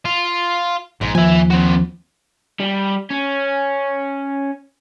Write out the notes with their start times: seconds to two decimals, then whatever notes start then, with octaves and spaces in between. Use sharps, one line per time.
0.05 F4
1.01 A#1 G#2
1.15 D#2 F3 E5 G#5
1.50 C4 F#4
2.60 G3
3.10 C#4